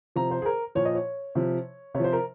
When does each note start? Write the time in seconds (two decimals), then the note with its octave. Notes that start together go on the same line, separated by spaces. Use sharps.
0.16 C3 F3 A#5
0.31 C5
0.42 G#4
0.46 A#4
0.75 A#2 F3 C#5
0.85 D#5
0.95 C#5
1.35 C3 F3
1.94 C3 C#5
2.00 F3 C5
2.13 A#4